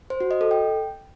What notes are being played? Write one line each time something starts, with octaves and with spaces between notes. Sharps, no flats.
C5
F#4
D#5
A4
G5